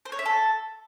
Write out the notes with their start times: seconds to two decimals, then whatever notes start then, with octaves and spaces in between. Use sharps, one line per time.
0.05 C5
0.12 C#5
0.19 E5
0.26 A4